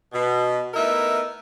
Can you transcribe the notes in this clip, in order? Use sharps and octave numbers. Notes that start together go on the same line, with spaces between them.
B2
A3 B3 D#4 E4 A#4 E5